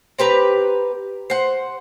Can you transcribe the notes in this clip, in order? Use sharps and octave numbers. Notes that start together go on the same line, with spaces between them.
C4 G4 B4 A#5
C5 F#5